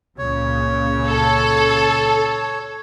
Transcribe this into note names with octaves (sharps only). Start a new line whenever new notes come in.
C#2 A#2 C#3 C#5
A4